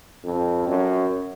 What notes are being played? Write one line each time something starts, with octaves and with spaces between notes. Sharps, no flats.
F2
F#2